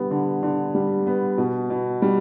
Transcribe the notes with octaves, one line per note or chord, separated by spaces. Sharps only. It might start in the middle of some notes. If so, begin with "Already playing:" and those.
Already playing: D3 G3 B3
D3
D3
G3
B3
B2
B2
G3